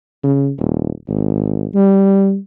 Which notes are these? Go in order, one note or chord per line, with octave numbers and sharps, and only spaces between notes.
C#3
D#1
G#1
G3